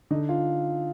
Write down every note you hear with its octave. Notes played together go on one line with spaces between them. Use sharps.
D3 D#4
F4